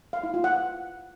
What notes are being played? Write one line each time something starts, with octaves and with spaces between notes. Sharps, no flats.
F5
E4
F4
F#5